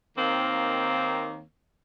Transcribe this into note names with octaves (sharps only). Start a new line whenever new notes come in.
D#2 D#3 A#3 C4